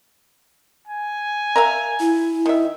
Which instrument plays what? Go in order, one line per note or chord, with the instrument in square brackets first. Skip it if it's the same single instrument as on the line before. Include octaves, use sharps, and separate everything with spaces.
[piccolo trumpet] G#5
[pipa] A#4 E5 F5
[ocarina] E4
[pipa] D#3 E5